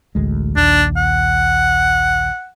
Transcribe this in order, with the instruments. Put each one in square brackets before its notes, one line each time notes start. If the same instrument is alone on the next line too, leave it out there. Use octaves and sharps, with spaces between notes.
[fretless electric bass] A1 D2 G#3
[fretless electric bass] A#1 D#2 [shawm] D4
[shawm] F#5